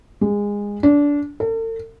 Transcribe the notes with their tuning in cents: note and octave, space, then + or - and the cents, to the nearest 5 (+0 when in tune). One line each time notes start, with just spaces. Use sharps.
G#3 -25
D4 -20
A4 +45